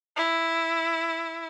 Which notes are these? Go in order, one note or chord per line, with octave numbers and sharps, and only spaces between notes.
E4